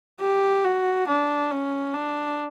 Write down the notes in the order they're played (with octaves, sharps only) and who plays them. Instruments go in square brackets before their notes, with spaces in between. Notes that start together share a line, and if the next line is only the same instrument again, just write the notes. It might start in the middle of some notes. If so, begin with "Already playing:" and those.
[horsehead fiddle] G4
F#4
D4
C#4
D4